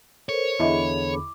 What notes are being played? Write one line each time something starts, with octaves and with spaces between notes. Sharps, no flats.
A4 A#4 C5 C#5
E2 D3 E4 G#4 D#5 E5 B5
D6